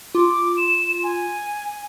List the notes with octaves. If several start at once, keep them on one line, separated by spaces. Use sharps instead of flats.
F4 D6
E7
G#5